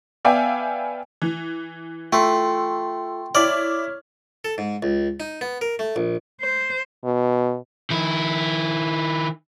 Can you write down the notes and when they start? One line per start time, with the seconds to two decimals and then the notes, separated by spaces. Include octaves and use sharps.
0.25 B3 D5 E5 F5 G5 G#5
1.22 E3
2.13 A3 F4 A4 G5 C6
3.35 E4 C#5 D5 D6 F6 F#7
4.45 A4
4.58 G#2
4.83 C#2
5.20 D#4
5.41 B3
5.61 A#4
5.79 A3
5.96 A#1
6.42 C5
7.04 B2
7.90 D#3 E4